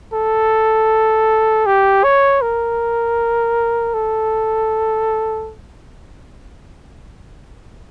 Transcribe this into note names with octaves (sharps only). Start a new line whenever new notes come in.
A4
G4
C#5
A#4
A4